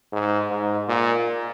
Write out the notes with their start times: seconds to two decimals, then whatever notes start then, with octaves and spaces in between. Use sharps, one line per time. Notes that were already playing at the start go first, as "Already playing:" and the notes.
0.12 G#2
0.50 G#2
0.88 A#2